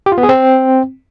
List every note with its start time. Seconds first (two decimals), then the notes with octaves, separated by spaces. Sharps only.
0.06 G4
0.12 F4
0.18 B3
0.23 G#4
0.29 C4